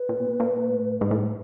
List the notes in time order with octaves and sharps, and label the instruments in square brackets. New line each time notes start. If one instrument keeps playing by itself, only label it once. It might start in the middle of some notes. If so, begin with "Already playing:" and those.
Already playing: [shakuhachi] B4
[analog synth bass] A#2
B2
A#2
A#2
A2
G#2
A2